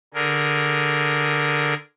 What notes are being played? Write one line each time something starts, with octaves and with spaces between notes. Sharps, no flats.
D3 G#4 A#4